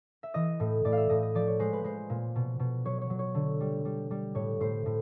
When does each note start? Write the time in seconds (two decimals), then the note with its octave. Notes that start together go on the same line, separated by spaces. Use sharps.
0.23 E5
0.34 E3 D#5
0.60 A2
0.85 A2 D5
0.92 E5 F5
1.09 A2 D#5
1.23 D#5
1.35 F3 D5
1.47 C#5
1.59 G#3 C5
1.73 B4
1.84 G#3 C5
2.10 A#2
2.36 B2
2.60 B2
2.85 F#3 C#5
3.01 C#5
3.10 F#3
3.19 C#5
3.35 D3
3.61 G3
3.85 G3
4.11 G3
4.35 A2 C#5
4.60 A2 C5
4.86 A2